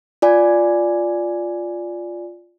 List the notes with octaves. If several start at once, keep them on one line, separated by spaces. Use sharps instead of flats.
F4 D5 G#5